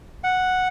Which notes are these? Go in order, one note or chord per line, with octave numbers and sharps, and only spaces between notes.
F#5